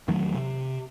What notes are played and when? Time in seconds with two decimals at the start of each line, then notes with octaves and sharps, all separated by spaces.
0.08 E2 D#3 F#3 A3
0.34 C3